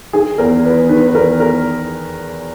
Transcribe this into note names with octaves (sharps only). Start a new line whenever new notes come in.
D#3 G#4
E2 A#4
E2 B4
D#3 B4
B4
E2 A#4
A#4